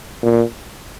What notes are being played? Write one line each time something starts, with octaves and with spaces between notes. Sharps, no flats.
A#2